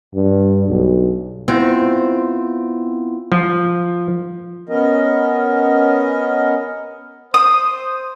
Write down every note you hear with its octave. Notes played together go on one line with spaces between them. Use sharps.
G2
B1
B3 C4 E4 F4
F3
B3 C#4 A#4 D#5
C5 D#6